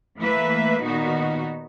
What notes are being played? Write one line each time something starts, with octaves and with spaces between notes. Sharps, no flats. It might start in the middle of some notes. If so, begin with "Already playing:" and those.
E3 A3 A#3 B4 E5
A#2 D#3 B3 D#4 F#4